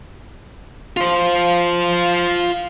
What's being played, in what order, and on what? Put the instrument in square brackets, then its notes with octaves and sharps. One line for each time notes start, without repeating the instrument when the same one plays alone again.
[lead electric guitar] F4 C5